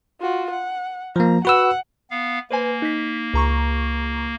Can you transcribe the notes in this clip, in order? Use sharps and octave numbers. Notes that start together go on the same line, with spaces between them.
F4 F#4
F#5
F3 A#3 A#5
F#4 B4 F#5 E6
B3 F5
A#3 B4 C5 G#5
D#4 B6
C#2 A#5 C#6